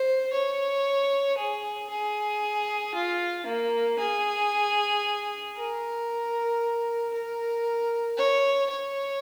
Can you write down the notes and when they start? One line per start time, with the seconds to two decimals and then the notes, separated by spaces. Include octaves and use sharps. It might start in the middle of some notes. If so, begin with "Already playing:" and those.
Already playing: C5
0.33 C#5
1.37 G#4
1.89 G#4
2.95 F4
3.46 A#3
3.99 G#4
5.56 A#4
7.13 A#4
8.18 C#5
8.70 C#5